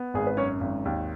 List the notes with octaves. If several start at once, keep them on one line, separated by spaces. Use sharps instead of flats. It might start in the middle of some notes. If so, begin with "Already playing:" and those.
Already playing: B3
G#1 G#4
B4
F#2 C#4 C#5
G#1
D#2